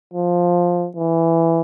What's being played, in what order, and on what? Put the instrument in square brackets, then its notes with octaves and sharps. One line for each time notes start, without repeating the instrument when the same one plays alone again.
[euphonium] F3
E3